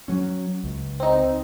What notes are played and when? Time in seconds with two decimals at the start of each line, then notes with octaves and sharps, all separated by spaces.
0.08 F#3 C#4
0.64 C#2
1.00 C4 D#4